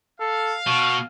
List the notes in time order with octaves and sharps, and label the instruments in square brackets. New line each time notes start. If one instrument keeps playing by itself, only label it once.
[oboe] A4 [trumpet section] F5
[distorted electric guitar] B2 [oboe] C#6